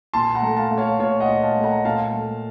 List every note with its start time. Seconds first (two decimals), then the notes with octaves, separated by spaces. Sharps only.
0.13 A#2 A5 C6
0.35 F#5 A#5
0.42 A3
0.57 F5 A5
0.71 A3
0.78 C#5 F5
0.99 A#2 C#5 F5
1.20 D#5 F#5
1.28 A#2
1.42 F5 A5
1.56 A3
1.64 F#5 A#5
1.85 A#2 F5 A5
2.13 A3